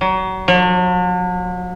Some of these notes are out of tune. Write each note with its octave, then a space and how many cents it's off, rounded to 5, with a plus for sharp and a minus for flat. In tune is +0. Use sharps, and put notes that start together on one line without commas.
F#3 +30
F#3 -45